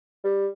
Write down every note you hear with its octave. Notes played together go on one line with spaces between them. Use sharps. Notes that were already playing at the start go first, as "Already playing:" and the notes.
G3